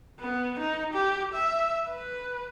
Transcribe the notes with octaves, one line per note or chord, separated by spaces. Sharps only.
B3
D#4
G4
E5
B4